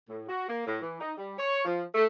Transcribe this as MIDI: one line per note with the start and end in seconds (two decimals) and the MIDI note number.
0.10 0.25 45
0.29 0.47 66
0.49 0.63 58
0.67 0.79 45
0.82 1.00 52
1.00 1.13 63
1.18 1.34 55
1.39 1.64 73
1.65 1.83 53
1.95 2.05 57